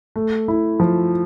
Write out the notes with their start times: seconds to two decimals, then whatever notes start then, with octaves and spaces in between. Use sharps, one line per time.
0.16 A3
0.48 E4
0.80 F3